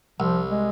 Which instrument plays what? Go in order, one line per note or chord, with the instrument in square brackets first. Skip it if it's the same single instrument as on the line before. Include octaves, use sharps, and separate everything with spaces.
[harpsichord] C2 [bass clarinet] F3
[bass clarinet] G#3